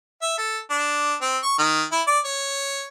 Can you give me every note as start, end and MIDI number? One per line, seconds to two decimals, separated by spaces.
0.22 0.37 76
0.38 0.59 69
0.70 1.14 62
1.21 1.38 60
1.42 1.54 85
1.58 1.83 51
1.91 2.02 64
2.07 2.19 74
2.24 2.87 73